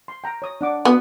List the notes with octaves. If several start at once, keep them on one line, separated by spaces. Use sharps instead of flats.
C6
G5 A#5
C#5 D#6
D4 F#5 D6
B3 F#4